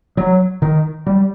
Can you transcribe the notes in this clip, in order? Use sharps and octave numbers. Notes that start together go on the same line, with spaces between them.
F#3
D#3
G3